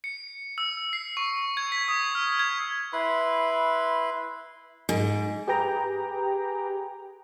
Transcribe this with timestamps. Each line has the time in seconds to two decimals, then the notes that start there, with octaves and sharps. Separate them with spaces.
0.04 C#7
0.58 E6
0.93 C7
1.17 C#6
1.57 G#6
1.72 B6
1.88 D#6
2.15 F6
2.39 G#6
2.93 E4 B4 B5 C6
4.89 G#2
5.47 G4 G#4 B4 G5 A#5